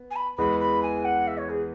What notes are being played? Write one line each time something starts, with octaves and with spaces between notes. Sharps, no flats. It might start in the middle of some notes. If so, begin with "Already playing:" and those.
Already playing: B3
G#5
B5
E2 E3 G#3 B3 B5
B5
G#5
F#5
E5
C#5
G#4